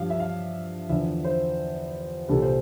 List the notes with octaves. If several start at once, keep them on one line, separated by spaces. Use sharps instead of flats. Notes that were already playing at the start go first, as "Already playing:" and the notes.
Already playing: G2 F3 F5
E5
F5
E2 D3 F3 E5
C5
C2 A#2 G3 A4
C5